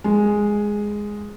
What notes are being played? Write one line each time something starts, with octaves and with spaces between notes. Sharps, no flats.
G#3